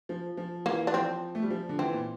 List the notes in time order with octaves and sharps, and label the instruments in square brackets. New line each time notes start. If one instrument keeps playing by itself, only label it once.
[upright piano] F3
F3
[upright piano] E3 [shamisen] A#3
[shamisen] D4
[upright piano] F3 [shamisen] C4
[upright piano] A3
G3
F3
D3
[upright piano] E3 [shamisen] C4
[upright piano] A#2